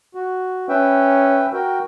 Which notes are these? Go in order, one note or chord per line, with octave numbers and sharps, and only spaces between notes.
F#4
C#4 B4 E5 G5
F#4 A#4 G5